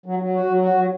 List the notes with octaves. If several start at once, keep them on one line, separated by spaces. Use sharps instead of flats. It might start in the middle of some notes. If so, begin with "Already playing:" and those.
F#3
F#3
F#4
F#3
F#4
F#3